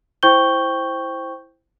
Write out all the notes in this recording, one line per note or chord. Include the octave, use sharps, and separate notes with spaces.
E4 C5 G5 C#6 G6 G7